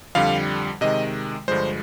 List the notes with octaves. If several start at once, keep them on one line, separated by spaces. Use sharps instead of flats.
F2 D3 G3 F5
C3 D#3 G#3 D#5
G2 D3 F3 G#3 C5